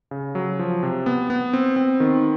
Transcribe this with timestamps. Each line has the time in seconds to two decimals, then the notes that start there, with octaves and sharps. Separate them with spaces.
0.11 C#3
0.35 F#3
0.59 F3
0.83 C3
1.06 B3
1.30 B3
1.53 C4
1.76 C4
2.00 D#3